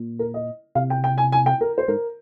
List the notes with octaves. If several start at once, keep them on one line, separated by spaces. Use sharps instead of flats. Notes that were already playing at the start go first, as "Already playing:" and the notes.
Already playing: A#2
A#4
D#5
C3 F5
G5
G5
G#5
G#5
G5
A#4
C5
G#2 A#4